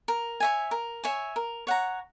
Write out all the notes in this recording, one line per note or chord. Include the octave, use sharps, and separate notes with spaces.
A#4
C#5 E5 G#5
A#4
C#5 E5 G#5
A#4
C#5 F#5 A#5